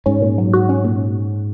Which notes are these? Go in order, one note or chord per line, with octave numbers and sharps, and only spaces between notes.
G#2 C#4
A#2
F#3
F#4
C#4
A#2